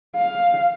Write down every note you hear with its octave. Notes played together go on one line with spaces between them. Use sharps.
F5